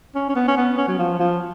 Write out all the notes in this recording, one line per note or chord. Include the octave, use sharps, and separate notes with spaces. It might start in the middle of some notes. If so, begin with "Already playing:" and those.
C#4
C#4
B3
C#4
B3
C#4
F#3
F3
F3